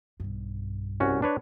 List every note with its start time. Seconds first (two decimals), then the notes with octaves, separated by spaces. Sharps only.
0.20 B1 G2
1.00 C2 C#4 F#4
1.22 D4 B4 C#5